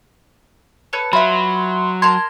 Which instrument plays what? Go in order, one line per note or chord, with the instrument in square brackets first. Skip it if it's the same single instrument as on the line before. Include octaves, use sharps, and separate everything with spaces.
[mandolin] A4 B4 C#5
[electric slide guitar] F#3 [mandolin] F4 B4 [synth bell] E5 B5 [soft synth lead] C6
[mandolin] A#4 A5 C6 [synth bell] G#6